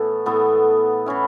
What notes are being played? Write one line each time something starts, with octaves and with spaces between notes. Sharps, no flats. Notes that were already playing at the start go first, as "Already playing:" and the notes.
Already playing: A2 E3 B3 A4
A2 E3 B3 A4
E3 C#4 E4